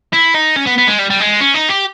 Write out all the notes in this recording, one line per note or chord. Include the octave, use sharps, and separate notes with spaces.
E4
D#4
C#4
B3
B3
G#3
G3
G3
G#3
C#4
D#4
G4